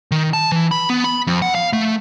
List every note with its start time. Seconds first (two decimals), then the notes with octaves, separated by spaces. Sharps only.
0.11 D#3
0.33 A5
0.52 E3
0.71 B5
0.90 B3
1.04 B5
1.27 F2
1.42 F#5
1.55 F5
1.73 A3